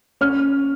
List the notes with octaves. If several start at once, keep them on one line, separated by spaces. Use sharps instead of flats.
C#4 F6